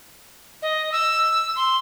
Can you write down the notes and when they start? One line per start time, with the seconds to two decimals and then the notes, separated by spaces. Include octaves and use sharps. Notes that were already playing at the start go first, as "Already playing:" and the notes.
0.62 D#5
0.92 E6
1.56 C6